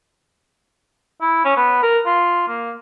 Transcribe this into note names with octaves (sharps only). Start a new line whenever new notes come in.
E4
C#4
B3
A#4
F4
A#3